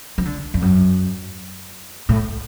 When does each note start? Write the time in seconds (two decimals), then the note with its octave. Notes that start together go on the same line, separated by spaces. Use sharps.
0.18 F3
0.25 D3
0.54 F2
0.62 F#2
2.09 A2